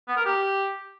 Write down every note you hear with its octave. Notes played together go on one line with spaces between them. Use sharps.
B3
A#4
G4